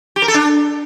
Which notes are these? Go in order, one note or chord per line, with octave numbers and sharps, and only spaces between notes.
G4
A#4
A4
D4